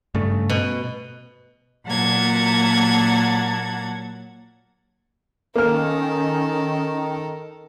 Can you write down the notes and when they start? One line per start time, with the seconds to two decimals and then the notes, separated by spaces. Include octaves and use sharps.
0.15 G2 C#3 A3
0.50 B2
1.87 A#2 F#3 A#3 F#5 A5 G#6
5.56 D#3 A#3 C#4 A4 A#4 F6